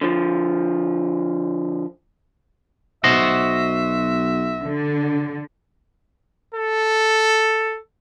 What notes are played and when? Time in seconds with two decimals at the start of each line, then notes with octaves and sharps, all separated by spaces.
0.01 D3 F3
3.04 B1 F#4 C5 D#5 E5
4.64 D3
6.55 A4